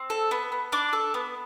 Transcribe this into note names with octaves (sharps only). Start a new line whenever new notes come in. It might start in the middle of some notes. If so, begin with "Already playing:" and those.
Already playing: C4
A4
B3
B3
D4 D6
A4
B3